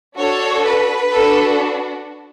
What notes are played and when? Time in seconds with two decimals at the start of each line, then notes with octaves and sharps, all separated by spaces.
0.17 D4 F#4 A4 C#5
0.65 B4
1.13 D4 F#4 A4